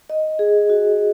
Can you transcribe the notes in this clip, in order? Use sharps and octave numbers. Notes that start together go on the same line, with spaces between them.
D#5
G#4
F#4